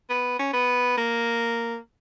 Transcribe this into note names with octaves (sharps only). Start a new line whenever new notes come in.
B3
C#4
B3
A#3